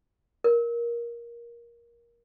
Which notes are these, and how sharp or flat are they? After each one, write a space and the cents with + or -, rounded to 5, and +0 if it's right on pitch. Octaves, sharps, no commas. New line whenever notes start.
A#4 +15